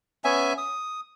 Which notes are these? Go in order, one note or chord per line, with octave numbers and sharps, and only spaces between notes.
B3 C#4 E5 G#5
D#6